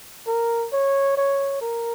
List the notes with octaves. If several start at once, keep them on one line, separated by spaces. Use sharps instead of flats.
A#4
C#5
C#5
A#4